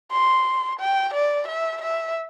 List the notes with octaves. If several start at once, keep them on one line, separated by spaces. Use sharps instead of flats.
C6
G5
D5
E5
E5